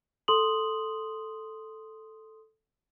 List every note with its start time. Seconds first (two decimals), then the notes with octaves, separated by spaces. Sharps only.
0.28 A4 C6 D#6 F#7